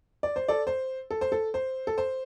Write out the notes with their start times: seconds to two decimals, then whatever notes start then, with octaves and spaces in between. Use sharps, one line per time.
0.23 D5
0.36 C5
0.48 A4 D5
0.67 C5
1.11 A4
1.21 C5
1.32 A4
1.54 C5
1.87 A4
1.98 C5